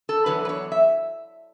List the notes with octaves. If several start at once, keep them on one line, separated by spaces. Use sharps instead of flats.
A4
E2 D3 F#3 B3 B4
B4
C#5
E5